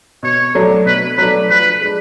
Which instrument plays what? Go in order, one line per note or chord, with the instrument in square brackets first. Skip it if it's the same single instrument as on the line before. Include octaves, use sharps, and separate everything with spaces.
[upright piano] B2 [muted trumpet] C#5
[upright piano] F#3 A3 D4
[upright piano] B2 [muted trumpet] B4
[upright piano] F#3 A3 D4 [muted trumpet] B4
[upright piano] F3 [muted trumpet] B4
[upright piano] G#3 D4